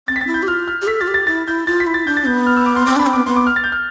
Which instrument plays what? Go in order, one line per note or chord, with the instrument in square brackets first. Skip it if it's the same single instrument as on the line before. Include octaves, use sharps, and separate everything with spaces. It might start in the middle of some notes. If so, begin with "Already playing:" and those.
[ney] C4 [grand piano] A6
[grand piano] B6
A6
[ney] E4
[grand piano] G6
[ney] G4
[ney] F4 [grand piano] F6
[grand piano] F6
[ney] G4
[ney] A4 [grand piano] B6
[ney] F4 [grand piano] A6
[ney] G4
[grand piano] A6
[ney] E4 [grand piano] A6
[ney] E4 [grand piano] G6
[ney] F4 [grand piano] A6
[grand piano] B6
[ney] E4
[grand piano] A6
[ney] D4 [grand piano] G6
[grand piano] A6
[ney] B3 [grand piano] G6
[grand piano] F6
E6
D6
C6
[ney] C4 [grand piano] D6
[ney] D4 [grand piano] B5
[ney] C4
[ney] B3 [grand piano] D6
[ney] B3 [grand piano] C6
[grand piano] D6
F6
A6
G6
F6